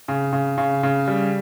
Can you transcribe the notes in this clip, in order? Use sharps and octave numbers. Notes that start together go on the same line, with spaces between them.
C#3
C#3
C#3
C#3
G3